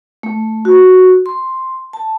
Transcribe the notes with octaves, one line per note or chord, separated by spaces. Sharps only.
A3
F#4
C6
A5